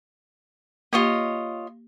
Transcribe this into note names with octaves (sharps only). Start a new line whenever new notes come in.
A#3 F4 G4 C#5 D#5